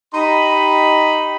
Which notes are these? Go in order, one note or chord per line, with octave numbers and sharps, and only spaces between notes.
D#4 G4 D#5 B5